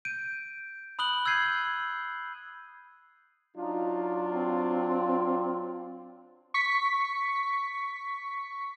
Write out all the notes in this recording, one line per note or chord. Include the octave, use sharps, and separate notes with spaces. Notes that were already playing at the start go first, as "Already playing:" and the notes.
G6 D7 D#7
B5 D#6 F#6 F#7 G7
E6 G6 G#6 C7 D#7
F#3 D4 D#4 F4
C4
C#6 B6